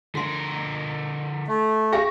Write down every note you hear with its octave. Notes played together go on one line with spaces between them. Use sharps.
D3 F#4 A#4 C6
A3
G4 G#4 F5 G5 C#6 A#6